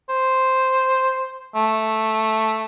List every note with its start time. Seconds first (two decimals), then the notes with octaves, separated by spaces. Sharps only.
0.09 C5
1.55 A3